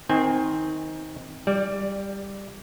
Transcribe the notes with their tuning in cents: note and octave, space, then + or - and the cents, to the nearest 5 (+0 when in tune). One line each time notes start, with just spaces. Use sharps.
D#3 +15 C4 +0 G#5 -25
G3 +10 D5 -10